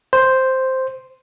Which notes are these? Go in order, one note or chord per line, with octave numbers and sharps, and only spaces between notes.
C5